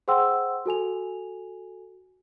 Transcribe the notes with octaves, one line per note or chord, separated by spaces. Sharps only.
G#4 C5 F#5 G5 C6 E6
F#4 A4 G#5 F7